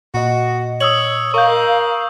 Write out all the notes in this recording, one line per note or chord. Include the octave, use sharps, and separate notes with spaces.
A#2 F#4 D#5
C#5 D#6 E6 F#7
A#4 F5 C#6 G6